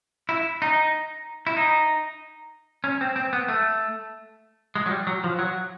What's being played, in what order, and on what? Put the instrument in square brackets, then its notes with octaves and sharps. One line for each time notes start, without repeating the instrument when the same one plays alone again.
[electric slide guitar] E4
D#4
E4
D#4
C#4
C4
C4
B3
A3
G#3
F#3
G3
F#3
F3
F#3